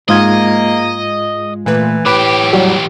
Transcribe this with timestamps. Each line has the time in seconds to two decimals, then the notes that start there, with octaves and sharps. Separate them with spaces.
0.09 G#2 G#3 A#3 F4 D#5 G#6
1.66 A#2 E3 A3 B4
2.06 A2 E3 G4 B4 D6 D7 E7
2.53 E2 F#3 G3